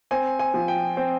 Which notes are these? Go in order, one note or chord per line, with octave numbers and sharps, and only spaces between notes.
C4 G#5
G#5
F3
G5
C4 G5